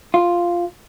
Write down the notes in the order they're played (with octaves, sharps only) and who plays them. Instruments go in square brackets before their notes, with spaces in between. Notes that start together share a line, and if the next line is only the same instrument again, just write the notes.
[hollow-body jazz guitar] F4